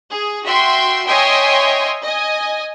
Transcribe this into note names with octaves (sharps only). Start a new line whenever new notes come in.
G#4
F#4 E5 G5 C6
C#5 D#5 E5 G5 G#5 C6
D#5 G#5